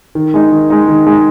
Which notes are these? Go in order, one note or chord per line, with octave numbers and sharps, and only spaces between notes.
D#3
G#3 D#4
D#3
G#3 D#4
D#3
G#3 D#4